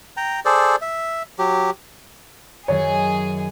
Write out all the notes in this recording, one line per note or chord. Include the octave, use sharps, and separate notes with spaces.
G5 A#5
G#4 A4 C5 D5
E5
F#3 G4
F#2 D#3 G#4 C#5